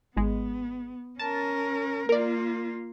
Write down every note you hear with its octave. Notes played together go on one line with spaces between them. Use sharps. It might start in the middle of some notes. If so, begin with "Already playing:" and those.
G#1 G#3 B3
C#4 A#4 A5
A#3 F4 A#4 D5